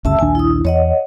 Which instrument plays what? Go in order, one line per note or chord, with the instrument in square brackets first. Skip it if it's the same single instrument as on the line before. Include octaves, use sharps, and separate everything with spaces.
[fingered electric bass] G1 D2 C#3 [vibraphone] E5 A5 E6
[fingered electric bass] A#1 D#2 D4 [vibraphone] G#5
[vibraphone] E4 D#6
[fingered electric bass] E2 [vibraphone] C#5 D#5 F#5